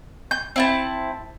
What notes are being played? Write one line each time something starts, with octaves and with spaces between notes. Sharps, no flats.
G6
C4 E4 A5